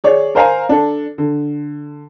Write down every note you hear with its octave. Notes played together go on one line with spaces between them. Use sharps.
G#4 C#5 D5
A#4 C5 F5 G#5 A#5
D4 A4
D3